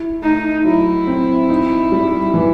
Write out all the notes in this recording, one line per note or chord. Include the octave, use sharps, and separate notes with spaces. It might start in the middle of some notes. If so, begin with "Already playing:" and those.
Already playing: E4
A3 D#4
F#3 E4
C4
D#4
G3
E3